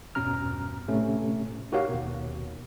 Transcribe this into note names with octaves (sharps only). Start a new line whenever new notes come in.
E2 G2 B2 C#4 A#5 F6
A2 C3 A3 C#4
D#4 F#4 G4 A#4 C#5 F5
D#2 B2